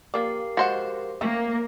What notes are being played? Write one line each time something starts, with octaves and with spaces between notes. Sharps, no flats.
F3 A#3 G4 A#4 D5 F5
F3 G#3 F#4 C5 F#5
A3 A#3 C4 C#4